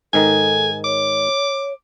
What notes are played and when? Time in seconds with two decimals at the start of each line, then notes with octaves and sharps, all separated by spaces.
0.13 G#2 D#3 D#4 A4 G#5
0.84 C#5 D6